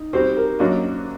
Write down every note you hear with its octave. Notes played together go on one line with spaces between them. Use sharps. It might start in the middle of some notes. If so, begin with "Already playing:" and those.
Already playing: D#4
G3 C4 F#4 G4 C5
A#4
F#2 F#3 A#3 D4 F#4 D#5